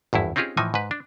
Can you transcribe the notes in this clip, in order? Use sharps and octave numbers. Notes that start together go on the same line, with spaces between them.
G#1 E2 G2 E4
C4 C#4 D#4 F4 G4 G#4
A2 E3 F3 D#4 G#5
G#2 B4
D4